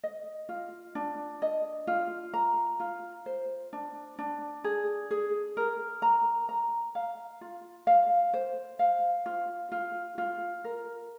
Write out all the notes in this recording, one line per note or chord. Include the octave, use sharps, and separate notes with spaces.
D#5
F4
D4
D#5
F4
A#5
F4
C5
D4
D4
G#4
G#4
A#4
A#5
A#5
F5
F4
F5
C5
F5
F4
F4
F4
A#4